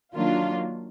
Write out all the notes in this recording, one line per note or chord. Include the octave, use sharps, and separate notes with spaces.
D#3 F#3 A#3 D4 F4